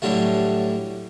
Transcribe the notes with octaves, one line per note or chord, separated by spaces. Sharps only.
A2 D3 F#3 G3 A3